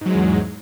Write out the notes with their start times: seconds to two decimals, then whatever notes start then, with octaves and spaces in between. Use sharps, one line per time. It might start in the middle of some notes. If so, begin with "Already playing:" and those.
0.01 G#2
0.06 F#3
0.10 G#3
0.15 E2